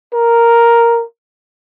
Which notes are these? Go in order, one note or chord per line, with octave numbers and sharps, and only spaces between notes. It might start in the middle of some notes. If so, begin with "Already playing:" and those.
A#4